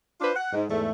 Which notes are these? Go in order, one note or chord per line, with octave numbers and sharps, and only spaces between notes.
D4 F4 B4 C5
F#5
G#2
E2 G#2 A3